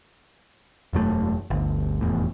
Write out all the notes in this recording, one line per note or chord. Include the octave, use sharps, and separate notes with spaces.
E1 F#2 F3 A3
G1 D2
F1 E2 A2